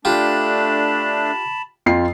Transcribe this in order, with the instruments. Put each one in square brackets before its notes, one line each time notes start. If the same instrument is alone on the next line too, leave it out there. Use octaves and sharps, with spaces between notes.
[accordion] A3 D4 [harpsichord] F4 G4 [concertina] A5 B5
[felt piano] F2 F4 C7